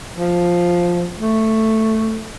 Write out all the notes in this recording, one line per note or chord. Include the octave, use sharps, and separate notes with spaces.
F3
A3